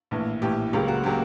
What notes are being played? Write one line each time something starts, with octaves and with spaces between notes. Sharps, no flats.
A#1 A2 E3
A#1 A2 E3 G4
C#2 C#3 F#3 A#3 G4
F#4
C#3 F#3 A#3 G4